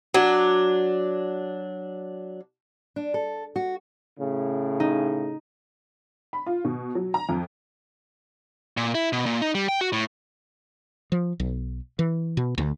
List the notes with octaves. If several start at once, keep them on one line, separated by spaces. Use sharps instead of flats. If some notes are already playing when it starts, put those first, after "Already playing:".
F#3 D4
D4
A4
F#4
A2 C#3
D#4
B5
F4
B2
F#3
A#5
F2
A#2
E4
B2
A#2
D#4
G3
G5
F#4
A2
F3
B1
E3
B2
D2